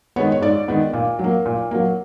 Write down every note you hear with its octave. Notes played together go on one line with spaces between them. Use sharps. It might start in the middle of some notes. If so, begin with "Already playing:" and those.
D#3 G#3 B3 C#5
C#5
G#2 D5
D#3 G#3 B3
A#2
F#3
A#3
A#2
F#3 A#3